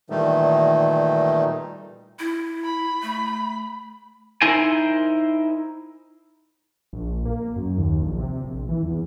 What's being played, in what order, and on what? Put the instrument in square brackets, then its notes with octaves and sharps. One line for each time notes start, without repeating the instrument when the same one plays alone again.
[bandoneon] A#2 D#3 E3 G3 A3 D#4
[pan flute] E4
[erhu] B5
[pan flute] A3
[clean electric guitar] D#4 E4 A#4 C5 G#5
[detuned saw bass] A#1
A#3
F#2
D#2
A#1
C3
A#1
E3
E2